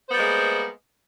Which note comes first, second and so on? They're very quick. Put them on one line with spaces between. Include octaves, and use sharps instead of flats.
C5 B3 G3 A#3 G#3